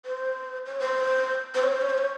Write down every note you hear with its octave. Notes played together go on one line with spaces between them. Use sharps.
C5
C#5
C5
C5
C#5
C5
C#5
C5
C#5